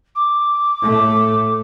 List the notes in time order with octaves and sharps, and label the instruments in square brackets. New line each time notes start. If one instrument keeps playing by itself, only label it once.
[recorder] D6
[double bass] A2 A3